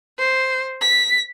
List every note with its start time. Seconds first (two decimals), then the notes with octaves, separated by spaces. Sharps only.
0.19 C5
0.81 B6